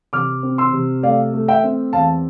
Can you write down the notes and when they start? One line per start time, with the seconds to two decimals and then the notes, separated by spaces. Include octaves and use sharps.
0.13 C3 D6 F6
0.43 C4
0.58 C6 E6
0.73 C3
1.03 A3 D5 F5
1.33 A3
1.48 E5 G5
1.63 C4
1.93 E2 F5 A5